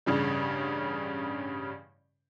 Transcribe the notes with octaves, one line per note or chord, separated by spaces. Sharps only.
A1 G2 C#3 G3